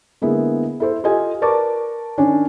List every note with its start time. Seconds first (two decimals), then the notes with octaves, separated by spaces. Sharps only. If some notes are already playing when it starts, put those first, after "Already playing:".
0.22 D3 G#3 A#3 B3 E4
0.80 E4 A4 C5
1.04 F4 G4 A4 D#5 G#5
1.42 A#4 B4 D5 A5 C#6 D6
2.18 D#3 C#4 D4 C#5